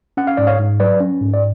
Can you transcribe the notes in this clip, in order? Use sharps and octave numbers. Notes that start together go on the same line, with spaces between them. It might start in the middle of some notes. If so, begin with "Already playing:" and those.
C#4 F#5
F5
G#2 D5
C#5 F5
G#2
F#3 B4 D5
C#4
G#2
D5